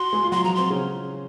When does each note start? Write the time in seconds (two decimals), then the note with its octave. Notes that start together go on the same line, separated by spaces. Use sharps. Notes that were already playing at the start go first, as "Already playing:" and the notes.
Already playing: F#4 F#5 C6
0.13 G#3 G#4
0.23 F4
0.32 F#3 F#4 C6
0.44 F3 F4 A#5
0.55 C4 C6
0.70 C#3 C#4